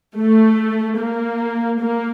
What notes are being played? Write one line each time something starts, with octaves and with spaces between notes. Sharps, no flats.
A3
A#3
A#3